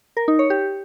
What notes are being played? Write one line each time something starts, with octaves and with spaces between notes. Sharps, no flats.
A#4
D#4
C#5
G4